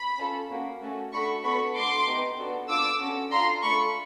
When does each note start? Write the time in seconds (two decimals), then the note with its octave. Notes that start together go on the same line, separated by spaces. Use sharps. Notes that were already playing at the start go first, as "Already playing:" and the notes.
Already playing: B5
0.18 C#4 F4 A4
0.50 A#3 C#4 F#4
0.81 A3 C#4 F#4 A4
1.12 A3 D4 F#4 A4 B5 C#6
1.44 B3 D4 F#4 A4 B5 C#6
1.75 A3 D4 F#4 A4 C6 D6
2.06 B3 D#4 G4
2.38 B3 D4 F#4 A4
2.69 D4 F4 A4 D6 E6
3.00 C#4 F#4 A4
3.31 D4 F4 A4 A#5 C6
3.62 A3 D4 F4 A4 B5 C#6